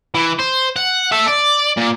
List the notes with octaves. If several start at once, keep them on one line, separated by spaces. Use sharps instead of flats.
E3
C5
F#5
A4 E5
D5
A#2